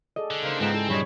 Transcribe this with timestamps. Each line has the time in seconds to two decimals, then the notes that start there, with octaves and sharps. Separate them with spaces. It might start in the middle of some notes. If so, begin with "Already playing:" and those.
0.16 G#4 A4 D5 D#5
0.31 D3
0.43 C#3 A#3 D#4 C5
0.60 G#2 F3 G#3 B3 C4 G5 A#5
0.74 E4 F4 G#4 A4
0.90 G2 A#2 F#3 G3 C#5 D#5 B5